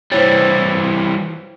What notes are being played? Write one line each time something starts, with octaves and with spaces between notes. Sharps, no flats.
E3 G3 C5 C#5